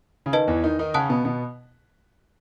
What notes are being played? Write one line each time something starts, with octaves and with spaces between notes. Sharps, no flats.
C#3
D#3 B4 D#5 A5
E2 E3
D#3 D#4
D#3 D#4
C#3 C#4 F#5 A5 D#6 F#6
B2 B3
B2 B3